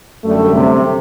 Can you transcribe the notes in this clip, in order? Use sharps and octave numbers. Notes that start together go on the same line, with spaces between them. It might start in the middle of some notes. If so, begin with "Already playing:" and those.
F#2 D3 G3 A3
C3 C4